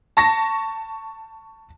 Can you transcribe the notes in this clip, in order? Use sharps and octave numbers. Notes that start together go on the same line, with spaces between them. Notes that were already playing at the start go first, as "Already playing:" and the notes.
A5 C#6 A#6